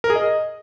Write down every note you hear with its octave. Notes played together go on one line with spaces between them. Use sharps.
A#4
G#4
D#5